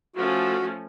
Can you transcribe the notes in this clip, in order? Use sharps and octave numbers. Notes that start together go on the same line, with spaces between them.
F3 A3 C#4 F#4